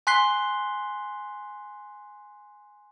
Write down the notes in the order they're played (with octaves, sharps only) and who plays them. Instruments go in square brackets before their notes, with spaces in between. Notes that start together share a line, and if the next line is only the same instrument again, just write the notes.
[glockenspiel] G#5 C6 F#6 B6 C7 G7